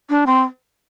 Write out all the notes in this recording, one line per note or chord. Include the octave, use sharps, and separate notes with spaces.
D4
C4